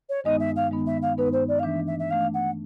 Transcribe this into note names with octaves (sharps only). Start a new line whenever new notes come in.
C#5
G2 D#3 G#3 B3 D#4 D#5
E5
F5
G2 D#3 G#3 B3 D#4
E5
F5
G2 D#3 G#3 B3 D#4 B4
C5
D5
F5
E3 A3 D4 E5
E5
E5
E3 A3 D4 F5
F#5